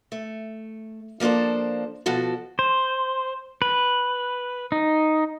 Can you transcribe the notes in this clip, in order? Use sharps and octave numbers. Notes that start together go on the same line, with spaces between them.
A3
F3 A#3 D4 A4 C5
B2 F3 F#4 A4
C5
B4
D#4